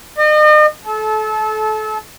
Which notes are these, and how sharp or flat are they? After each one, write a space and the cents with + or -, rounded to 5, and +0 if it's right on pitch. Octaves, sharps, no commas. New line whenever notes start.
D#5 -40
A4 -30